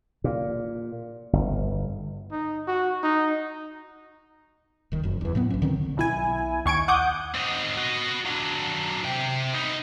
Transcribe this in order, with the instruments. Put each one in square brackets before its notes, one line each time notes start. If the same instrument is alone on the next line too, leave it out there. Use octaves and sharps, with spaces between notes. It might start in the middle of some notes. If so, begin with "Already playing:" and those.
[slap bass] A#2
G1
[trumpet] D#4
F#4
D#4
[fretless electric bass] D#1 D#3
F1 F#2
E2 E3
A2 F#3 B3
B1 C#4
D3 D#3 C4
[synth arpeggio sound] B1 E4 G#5
D#2 C#6 G#6 D7
F#5 D6 D#6 G6
[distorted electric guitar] C4 D#4
F#4 D#5
F#3 D4
C3 G5
B3 D#4